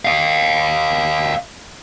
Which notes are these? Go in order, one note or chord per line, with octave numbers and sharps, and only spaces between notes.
D#5 F5